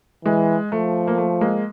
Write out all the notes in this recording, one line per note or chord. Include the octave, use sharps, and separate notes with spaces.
E3 G#3
F3 A3
A#3
A3
G#3 A#3